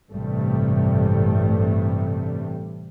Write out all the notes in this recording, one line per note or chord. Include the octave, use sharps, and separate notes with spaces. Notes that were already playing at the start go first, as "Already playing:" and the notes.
A1 G2 C3 G3 A3